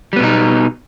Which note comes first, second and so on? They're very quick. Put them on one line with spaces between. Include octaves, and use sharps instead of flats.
G3 B3 B2 D#4